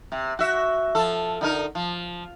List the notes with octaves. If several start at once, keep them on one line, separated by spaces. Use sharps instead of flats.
C3
F#4 E5
F3 A4
D3 D#4 A#4
F3